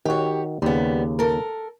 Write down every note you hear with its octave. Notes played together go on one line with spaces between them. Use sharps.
D#3 F#4 G4 C#5
D#2 C#3 G3 B3
A4 A#4